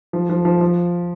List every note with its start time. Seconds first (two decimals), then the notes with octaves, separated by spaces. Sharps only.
0.13 F3
0.29 F3
0.45 F3
0.61 F3